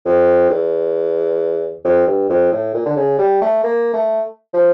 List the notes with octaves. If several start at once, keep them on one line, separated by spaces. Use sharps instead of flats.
F2
E2
F2
G2
F2
A2
A#2
D3
C#3
G3
A3
A#3
A3
F3